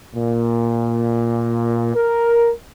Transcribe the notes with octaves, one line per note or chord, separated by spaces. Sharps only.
A#2
A#4